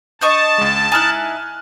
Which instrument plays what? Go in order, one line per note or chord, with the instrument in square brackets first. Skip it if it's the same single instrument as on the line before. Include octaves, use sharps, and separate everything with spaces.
[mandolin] D4 D#5 C#6 [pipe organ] A5 [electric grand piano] G6
[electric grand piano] C#2 G#3
[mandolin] D#4 E4 [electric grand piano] G#5 F6 F#6